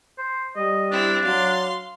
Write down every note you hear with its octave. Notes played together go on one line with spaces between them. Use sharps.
C5
G3 D#5
C4 D4 E4
F#3 F5 C6